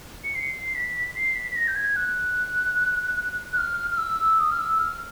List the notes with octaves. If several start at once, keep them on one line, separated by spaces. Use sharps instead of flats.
C#7
C7
B6
C7
B6
B6
A#6
G6
G#6
F#6
F#6
F6
F6
E6
D#6
F6
E6
F6